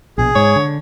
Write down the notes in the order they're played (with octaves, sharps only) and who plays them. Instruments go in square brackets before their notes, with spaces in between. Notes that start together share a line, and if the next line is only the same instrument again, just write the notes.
[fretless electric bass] A#1 B2 [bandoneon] G#4
[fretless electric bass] G#2 [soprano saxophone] C#5
[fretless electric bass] D3